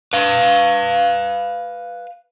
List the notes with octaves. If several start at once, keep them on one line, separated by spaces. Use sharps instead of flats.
B4 F5